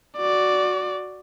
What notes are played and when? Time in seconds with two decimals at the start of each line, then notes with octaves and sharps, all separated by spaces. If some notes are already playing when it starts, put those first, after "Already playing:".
0.17 F#4 D5